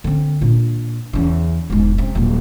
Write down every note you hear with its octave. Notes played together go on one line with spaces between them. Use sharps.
D3 C4
A#2 D4
E2 C#3
E1 G#2
C3
D#1 B1